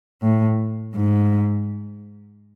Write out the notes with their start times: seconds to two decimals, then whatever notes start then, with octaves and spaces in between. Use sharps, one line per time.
0.22 A2
0.95 G#2